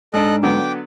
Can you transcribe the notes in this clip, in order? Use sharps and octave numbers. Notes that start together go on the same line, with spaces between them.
G#2 D4 A4 D#5 F#6
D3 F#3 B3 G5 D6